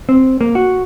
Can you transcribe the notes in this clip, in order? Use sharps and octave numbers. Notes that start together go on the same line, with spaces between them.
C4
A#3
F#4